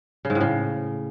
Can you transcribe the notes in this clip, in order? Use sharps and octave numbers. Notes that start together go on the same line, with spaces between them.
C#3
G#2
A2
C#3